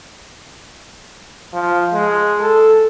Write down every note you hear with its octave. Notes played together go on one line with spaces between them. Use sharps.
F3
G#3
A4